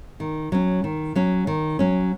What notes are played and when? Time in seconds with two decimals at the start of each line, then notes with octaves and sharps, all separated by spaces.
0.20 D#3
0.52 F#3 C#4
0.84 D#3
1.16 F#3 C#4
1.47 D#3
1.79 F#3 C#4